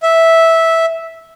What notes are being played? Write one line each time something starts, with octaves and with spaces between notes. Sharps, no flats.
E5